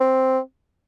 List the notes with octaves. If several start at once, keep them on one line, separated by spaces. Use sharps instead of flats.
C4